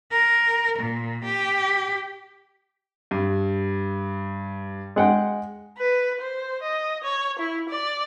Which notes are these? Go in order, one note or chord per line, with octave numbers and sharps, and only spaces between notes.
A#4
A#2
G4
G2
G#3 F#5 G5
B4
C5
D#5
C#5
E4
D5